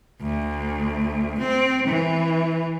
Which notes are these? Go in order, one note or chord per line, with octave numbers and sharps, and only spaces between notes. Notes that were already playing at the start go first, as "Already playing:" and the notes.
D2
C4
E3